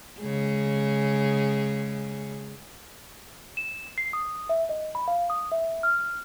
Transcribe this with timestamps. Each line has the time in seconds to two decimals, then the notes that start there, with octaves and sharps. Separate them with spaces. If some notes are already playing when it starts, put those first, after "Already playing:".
0.20 C#3 G#3 G#4
3.57 E7
3.98 C7
4.13 D#6
4.49 E5
4.69 D#5
4.95 B5
5.08 F5
5.30 D#6
5.52 E5
5.83 F6